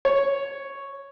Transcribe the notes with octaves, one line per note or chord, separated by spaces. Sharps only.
C#5